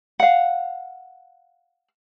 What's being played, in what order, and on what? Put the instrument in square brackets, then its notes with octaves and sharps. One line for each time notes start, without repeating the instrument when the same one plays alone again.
[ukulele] F5 F#5